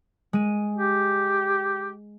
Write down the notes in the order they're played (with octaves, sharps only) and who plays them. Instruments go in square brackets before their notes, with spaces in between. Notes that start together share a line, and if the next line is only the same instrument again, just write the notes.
[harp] G#3 D#7
[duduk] G4